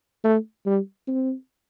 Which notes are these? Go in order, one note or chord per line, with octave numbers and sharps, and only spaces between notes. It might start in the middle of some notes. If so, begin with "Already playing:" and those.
A3
G3
C4